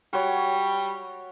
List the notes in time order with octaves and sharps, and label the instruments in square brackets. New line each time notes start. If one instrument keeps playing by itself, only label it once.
[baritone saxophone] G3 [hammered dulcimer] F#4 C#5